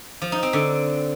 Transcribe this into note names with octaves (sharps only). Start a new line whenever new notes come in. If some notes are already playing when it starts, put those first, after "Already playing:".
F3
D#4
C4
D3